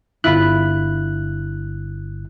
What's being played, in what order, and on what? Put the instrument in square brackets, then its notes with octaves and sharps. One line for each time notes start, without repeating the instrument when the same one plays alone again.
[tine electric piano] G1 F#6 [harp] E4 F4 B5